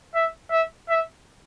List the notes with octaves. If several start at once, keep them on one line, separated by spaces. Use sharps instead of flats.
E5
E5
E5